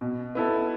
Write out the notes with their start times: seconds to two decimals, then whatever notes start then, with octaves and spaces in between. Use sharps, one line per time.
0.01 B2
0.35 B3 E4 A4